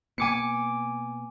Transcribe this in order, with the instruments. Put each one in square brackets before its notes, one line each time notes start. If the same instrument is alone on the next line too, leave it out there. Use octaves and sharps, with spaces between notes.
[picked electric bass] B2 A#3 B3 [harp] G#5 D6 C#7